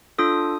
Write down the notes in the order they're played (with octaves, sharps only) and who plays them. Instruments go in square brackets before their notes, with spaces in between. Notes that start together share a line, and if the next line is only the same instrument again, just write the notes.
[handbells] D4 F4 A4 D#6